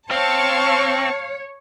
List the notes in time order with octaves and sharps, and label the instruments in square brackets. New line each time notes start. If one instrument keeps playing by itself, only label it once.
[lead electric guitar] C4 [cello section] C#5 [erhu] F5 [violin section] A5 C#6